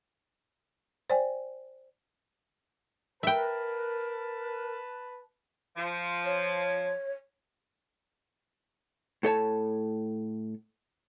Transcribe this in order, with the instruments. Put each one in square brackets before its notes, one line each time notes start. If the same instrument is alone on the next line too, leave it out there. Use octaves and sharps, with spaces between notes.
[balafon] C5 D5 G5 G#5
[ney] A#4 [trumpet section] B4 A5 [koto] E5 G5
[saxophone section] F3
[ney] C#5
[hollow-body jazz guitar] A2 A4 C#5 A5